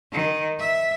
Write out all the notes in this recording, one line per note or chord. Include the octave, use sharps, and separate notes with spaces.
D#3
E5